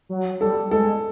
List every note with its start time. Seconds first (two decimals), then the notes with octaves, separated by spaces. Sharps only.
0.09 F#3
0.41 G3 A4
0.71 G#3 A4